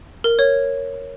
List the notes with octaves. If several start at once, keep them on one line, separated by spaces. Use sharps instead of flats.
A#4
C#5